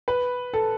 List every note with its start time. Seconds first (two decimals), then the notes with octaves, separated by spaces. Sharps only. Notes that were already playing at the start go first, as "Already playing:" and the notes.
0.08 B4
0.54 A4